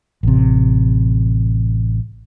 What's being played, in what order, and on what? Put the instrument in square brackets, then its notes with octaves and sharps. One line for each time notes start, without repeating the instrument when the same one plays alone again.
[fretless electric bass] A1 C3